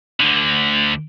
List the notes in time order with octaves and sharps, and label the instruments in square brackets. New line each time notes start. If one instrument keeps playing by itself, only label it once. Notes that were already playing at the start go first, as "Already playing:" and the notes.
[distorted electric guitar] D2 D3